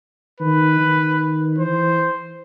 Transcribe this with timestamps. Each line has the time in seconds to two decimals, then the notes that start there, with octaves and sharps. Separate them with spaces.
0.40 D#3 B4
0.80 D#3
1.58 E3 C5